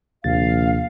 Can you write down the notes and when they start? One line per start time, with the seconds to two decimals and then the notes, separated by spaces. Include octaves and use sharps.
0.24 A#1 D#2 C3 F5 A6